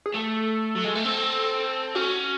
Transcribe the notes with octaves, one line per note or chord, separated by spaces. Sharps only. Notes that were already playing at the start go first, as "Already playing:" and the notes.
G#4
A3 A4
F#3
G#3
A3
C4
C#4 F#4